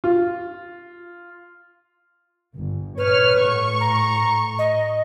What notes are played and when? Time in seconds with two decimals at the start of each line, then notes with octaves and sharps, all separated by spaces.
0.04 F4
2.55 G1
2.98 B4 C#5 F6
3.39 A2 C#6
3.81 A#5
4.59 D#5